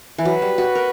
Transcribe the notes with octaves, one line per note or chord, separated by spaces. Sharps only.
E3
F#3 B4
G3
F#4
A#4